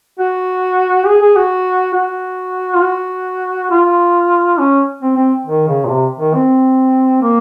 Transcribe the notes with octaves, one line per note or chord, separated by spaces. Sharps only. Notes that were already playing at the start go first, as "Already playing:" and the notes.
F#4
G#4
G#4
F#4
F#4
F4
F#4
F4
C#4
C4
C4
D#3
C#3
A#2
C3
D#3
C4
A#3